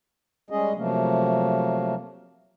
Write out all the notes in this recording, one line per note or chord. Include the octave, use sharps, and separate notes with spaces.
G3 G#3 C#4 G#4 D#5
C3 F3 F#3 A3 A#3